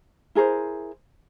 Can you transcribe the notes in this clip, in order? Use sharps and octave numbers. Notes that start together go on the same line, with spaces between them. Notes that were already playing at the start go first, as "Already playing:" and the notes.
E4 G#4 A#4 C5